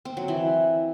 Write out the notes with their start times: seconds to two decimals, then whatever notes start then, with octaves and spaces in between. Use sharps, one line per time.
0.05 C4
0.17 F#3
0.28 E3